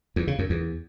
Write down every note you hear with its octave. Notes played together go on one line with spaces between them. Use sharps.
E2
C#3
F#2
E2